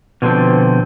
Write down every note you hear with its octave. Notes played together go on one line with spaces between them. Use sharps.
B2 D3 F3 C4